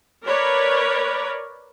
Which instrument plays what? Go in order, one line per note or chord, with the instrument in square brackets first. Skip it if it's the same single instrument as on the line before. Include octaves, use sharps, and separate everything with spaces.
[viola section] A#4 B4 C#5 D5